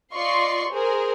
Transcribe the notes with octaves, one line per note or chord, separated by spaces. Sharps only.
F4 D5 D#5 C6 C#6 C7
G#4 A#4 C5